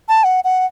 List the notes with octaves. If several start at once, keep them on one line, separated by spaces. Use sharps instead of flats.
A5
F#5
F#5